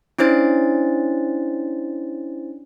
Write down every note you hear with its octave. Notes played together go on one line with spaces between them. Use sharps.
C#4 D4 E4 C5 A6